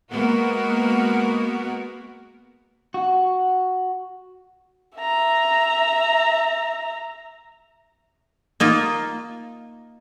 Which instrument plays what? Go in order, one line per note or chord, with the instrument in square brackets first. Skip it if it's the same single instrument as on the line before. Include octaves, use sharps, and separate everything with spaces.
[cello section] G#3 A#3 B3 F#4 A#4
[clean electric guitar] F#4
[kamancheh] E5 A#5
[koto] A#3 D#4 F4